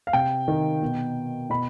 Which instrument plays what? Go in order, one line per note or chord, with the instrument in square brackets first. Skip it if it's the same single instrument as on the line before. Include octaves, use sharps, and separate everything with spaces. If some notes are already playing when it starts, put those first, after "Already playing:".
[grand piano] F5
C3 G5
D#3
B2
B2 B5